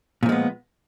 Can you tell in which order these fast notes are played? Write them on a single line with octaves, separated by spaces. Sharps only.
A#2 F3 G#3 B3